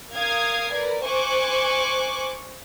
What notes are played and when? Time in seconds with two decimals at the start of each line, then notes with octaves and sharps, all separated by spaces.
0.14 A#4 F5 D#6 G#6 C7
0.73 A#4 B4 D5
1.04 C5 G#5 C#6 D6 F#6